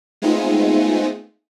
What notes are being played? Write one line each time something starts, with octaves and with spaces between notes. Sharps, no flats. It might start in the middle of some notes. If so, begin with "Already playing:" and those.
G#3 A3 B3 C4 D#4 F4